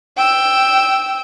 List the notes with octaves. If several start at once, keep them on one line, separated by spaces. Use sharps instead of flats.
G5 E6